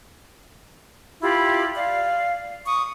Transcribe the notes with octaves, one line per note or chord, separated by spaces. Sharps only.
E4 F4 G4 B5
D5 F5
C#6 D#6